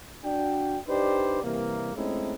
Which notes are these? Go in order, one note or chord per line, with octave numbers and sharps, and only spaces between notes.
D4 F#4 G5
D4 D#4 G4 B4 C5 D5
C3 E3 G3 A#3
G#3 A3 C4 C#4 D#4 E4